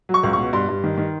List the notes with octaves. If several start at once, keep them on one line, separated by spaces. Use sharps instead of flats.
F#3
C#6
C#2
C#6
B2
G2 C6
G2
D#3
D#3